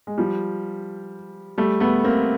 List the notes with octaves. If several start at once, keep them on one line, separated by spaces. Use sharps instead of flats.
G#3
F3 G3
G3 A3
A3 B3
A#3 C4